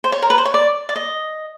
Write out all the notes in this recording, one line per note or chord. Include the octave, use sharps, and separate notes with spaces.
C5
C#5
A#4
B4
C5
C#5
D5
D5
D#5